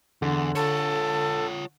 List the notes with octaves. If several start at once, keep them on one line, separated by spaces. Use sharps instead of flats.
E2 D3
F4 A4 C#5